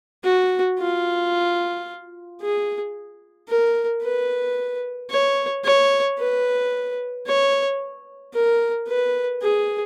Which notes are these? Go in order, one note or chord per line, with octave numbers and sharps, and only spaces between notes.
F#4
F4
G#4
A#4
B4
C#5
C#5
B4
C#5
A#4
B4
G#4